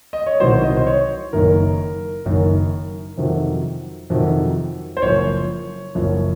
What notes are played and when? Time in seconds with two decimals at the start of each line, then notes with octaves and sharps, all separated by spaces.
0.13 D#5
0.27 C#5
0.40 C2 C3 D#3 F#3 C5
0.63 D#5
0.77 C5
0.87 C#5
1.33 F#1 F#2 D#3 A#4
2.25 F#1 F#2 D#3
3.18 F2 C3 D#3 F#3
4.10 F2 C3 D#3 F#3
4.97 C5
5.02 F#1 F#2 F3 C#5
5.95 F#1 F#2 F3